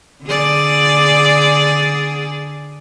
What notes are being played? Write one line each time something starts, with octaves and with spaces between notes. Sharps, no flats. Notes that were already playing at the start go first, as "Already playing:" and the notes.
D3 G#4 D5